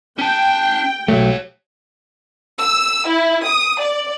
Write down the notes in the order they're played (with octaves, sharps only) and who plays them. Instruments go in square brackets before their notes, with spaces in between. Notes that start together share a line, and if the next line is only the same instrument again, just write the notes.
[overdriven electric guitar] C#4 A5 [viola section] G5
[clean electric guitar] B1 F#3 A3 [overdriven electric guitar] G4 C#5
[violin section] E6
E4
D#6
D5